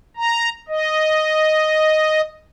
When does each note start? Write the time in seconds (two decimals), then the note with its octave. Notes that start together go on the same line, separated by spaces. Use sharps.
0.16 A#5
0.68 D#5